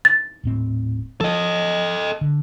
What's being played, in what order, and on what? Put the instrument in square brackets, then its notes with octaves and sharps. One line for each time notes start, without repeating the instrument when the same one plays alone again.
[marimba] A6
[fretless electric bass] D#1 A2 C4
[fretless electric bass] F3 [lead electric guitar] A4 D#5
[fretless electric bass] D3